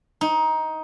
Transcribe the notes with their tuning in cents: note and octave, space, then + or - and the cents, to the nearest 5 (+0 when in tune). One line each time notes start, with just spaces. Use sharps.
D#4 +15